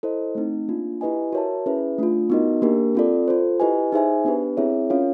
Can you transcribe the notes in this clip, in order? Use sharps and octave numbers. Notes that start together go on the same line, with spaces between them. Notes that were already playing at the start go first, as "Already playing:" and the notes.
E4 A4 C5 D#5
A3 C4 D#4
A#3 D4 F4
E4 G4 B4 D#5 G#5
F#4 A#4 C#5 E5 A5
C#4 E4 G#4 B4 E5
A3 D4 F4
B3 D#4 F#4 A#4 D#5
A#3 D4 G4 A#4
C4 F4 A4 D5
F4 A4 C5
E4 G4 B4 D#5 G#5
D#4 G#4 C5 E5 G#5
B3 D4 G4 B4
C4 E4 G#4 C#5 E5
C#4 F4 A#4 C#5 F5